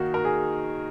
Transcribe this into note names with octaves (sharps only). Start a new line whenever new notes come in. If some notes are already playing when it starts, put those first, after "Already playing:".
Already playing: D#3 A#3 D#4 F#4 A#4
A#4
G#4